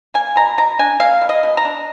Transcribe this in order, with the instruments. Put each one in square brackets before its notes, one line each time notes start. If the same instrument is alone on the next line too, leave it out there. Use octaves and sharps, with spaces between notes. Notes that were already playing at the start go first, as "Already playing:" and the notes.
[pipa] A#3 G#5
B2 A#5
B2 A#5
D4 G#5
A#3 F5
B2
D#5
B2
A#5
D4